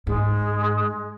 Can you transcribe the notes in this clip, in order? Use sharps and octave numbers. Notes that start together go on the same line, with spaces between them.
G#2 G#3